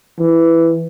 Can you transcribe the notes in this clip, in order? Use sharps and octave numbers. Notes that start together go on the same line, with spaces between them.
E3